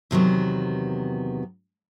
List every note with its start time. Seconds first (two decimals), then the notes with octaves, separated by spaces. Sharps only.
0.11 E2 C3 D#3 F#3 B3